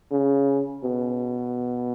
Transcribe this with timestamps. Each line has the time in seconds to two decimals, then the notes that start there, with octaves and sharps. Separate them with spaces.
0.12 C#3
0.84 B2